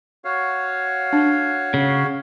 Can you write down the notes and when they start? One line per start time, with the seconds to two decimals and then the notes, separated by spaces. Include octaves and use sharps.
0.25 F#4 C#5 F5
1.13 D4
1.74 C#3